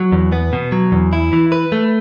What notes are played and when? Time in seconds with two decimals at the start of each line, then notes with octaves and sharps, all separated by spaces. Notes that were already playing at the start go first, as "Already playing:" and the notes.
Already playing: F#3
0.12 E2
0.32 B3
0.53 B2
0.72 F#3
0.92 E2
1.13 E4
1.33 E3
1.52 B4
1.72 A3